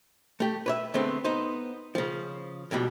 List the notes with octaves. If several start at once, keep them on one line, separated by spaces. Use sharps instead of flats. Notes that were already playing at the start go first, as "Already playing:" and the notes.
A3 G4
B4 C#5 E5
D3 G#3 A3 B3 C4
B3 D#4 C5
C#3 F3
F2 G#2 B2 G3